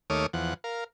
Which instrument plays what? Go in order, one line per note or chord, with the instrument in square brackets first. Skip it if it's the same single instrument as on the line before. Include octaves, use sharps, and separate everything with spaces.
[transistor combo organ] D#2 A3 C#5 D6 D#6 F6
E2 F3 F#5
A#4 F5